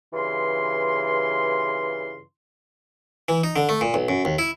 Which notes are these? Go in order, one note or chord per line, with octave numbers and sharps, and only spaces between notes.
G2 C#3 E3 F4 C6
E3
D#4
D3
A3
A#2
B1
F#2
D#2
E4